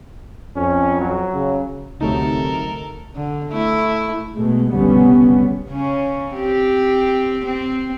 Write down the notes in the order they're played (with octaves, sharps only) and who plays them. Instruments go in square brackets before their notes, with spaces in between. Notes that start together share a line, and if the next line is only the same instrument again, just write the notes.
[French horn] F2 [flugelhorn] C#4
[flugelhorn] F#3
[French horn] C#3
[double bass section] D2 [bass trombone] C3 [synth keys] F#3 A3 D#4 [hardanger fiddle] A4 A#4
[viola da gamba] D3
A3 E4
[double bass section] B2 G#3 A3
F1 B1 D3 G3 B3 C#4
[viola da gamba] C#3 C#4
C4 G4
C4